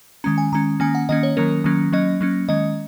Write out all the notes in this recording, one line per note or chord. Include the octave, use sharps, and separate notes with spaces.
D#3 G#3 C#4 A#5
G#5
D#3 G#3 C#4 A#5
D#3 A#3 C#4 G#5
F#5
D#3 A#3 C#4 D#5
C#5
D#3 F#3 A#3 C#4 A#4
D#3 F#3 A#3 C#4
F#3 A#3 C#4 D#5
F#3 A#3 C#4
D#3 G#3 C#4 D#5